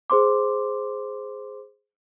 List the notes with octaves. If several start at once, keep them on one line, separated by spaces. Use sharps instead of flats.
G#4 C5 C6 D6